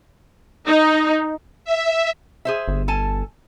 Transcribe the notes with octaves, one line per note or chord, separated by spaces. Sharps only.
D#4
E5
G#4 C5 E5
G1
A4 G#5 A5